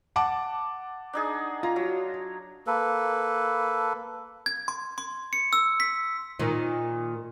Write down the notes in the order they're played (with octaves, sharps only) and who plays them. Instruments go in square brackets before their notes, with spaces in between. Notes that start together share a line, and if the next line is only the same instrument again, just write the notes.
[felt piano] F#5 A5 D6
[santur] D4 D#4 G#4
[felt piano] F4 [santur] A#5
[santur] F#3
[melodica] A#3 A4 B4
[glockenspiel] G#6
C6
C6
C#7
E6
B6
[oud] A#2 D#3